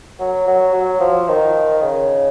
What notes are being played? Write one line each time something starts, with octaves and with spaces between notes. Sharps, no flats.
F#3
F#3
F#3
F3
D#3
C#3